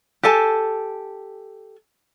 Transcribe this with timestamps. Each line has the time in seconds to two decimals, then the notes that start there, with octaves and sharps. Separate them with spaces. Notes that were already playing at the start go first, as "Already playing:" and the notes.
0.23 G4 A4 G#5 A5